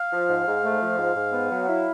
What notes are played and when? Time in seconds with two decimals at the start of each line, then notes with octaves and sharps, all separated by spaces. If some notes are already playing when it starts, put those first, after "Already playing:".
Already playing: F5
0.11 F3
0.29 G#2
0.46 G#2
0.64 A3
0.80 F3
0.97 G#2
1.16 G#2
1.32 B3
1.50 F#3
1.67 E4